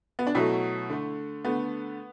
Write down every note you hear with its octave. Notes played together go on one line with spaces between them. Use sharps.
B3
D4
B2 F#3 A3 E4
D3 A3
D3 A3 B3